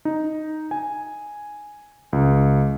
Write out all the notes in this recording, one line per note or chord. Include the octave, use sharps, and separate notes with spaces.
D#4
G#5
C#2